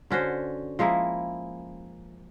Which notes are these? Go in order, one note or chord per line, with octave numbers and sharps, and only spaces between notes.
D3 C#4 F#4 C5
F3 G#3 A#3 E4